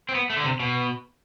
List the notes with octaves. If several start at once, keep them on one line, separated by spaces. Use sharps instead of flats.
C4
B3
A3
D3
C3
B2